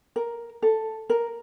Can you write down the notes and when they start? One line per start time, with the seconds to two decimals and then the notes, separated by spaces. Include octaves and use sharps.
0.16 A#4
0.62 A4
1.10 A#4